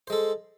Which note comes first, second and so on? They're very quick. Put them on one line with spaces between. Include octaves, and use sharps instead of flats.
C5 G#3 A4